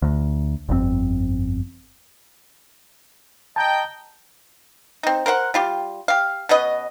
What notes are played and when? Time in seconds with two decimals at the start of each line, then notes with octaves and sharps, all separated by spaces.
0.02 D2
0.69 G1 F2 D3 C4
3.56 D#5 G5 A5 A#5
5.03 C4 D#4
5.26 A#4 C5 F5 F#5
5.54 G3 F4 G4
6.08 G4 F5
6.49 B2 C#4 B4 D#5